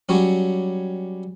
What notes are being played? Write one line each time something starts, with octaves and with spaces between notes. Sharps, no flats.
F#3 G3 C#4